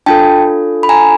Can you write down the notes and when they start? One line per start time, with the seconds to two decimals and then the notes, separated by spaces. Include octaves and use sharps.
0.06 D4 F4 A4 G5 A5
0.83 B5
0.89 G#5 A#5